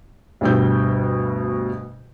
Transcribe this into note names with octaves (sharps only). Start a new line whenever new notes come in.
D2 G2 B2 G5 E6 G6